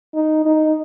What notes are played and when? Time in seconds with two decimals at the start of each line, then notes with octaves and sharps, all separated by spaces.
0.14 D#4
0.46 D#4